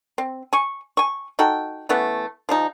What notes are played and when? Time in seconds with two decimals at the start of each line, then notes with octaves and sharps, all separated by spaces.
0.18 C4
0.53 G#5 C#6
0.97 G#5 C#6
1.39 D#4 F#4 A4 G5
1.89 E3 A3 B3 C#4
2.49 F3 G3 D#4